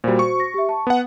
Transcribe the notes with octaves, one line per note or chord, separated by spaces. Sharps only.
A#2 G3 F#4 C5
C#6
A#6
G4 E5
A5
B3 F#5